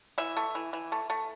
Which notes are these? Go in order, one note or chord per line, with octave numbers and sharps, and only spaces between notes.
E3 E5
A3
E3
E3
A3
A3